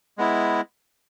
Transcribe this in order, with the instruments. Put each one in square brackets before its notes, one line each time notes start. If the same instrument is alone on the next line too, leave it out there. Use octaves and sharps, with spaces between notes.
[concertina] G#3 B3 E4